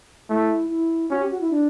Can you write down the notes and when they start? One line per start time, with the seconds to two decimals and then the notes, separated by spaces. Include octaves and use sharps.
0.29 A3 E4
0.70 E4
1.10 C#4 F#4
1.20 G4
1.30 F#4
1.41 E4
1.51 D4